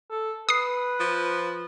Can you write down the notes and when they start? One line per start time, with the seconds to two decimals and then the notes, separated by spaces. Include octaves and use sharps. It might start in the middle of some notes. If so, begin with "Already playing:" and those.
0.10 A4
0.49 B4 D#6 C7
1.00 F3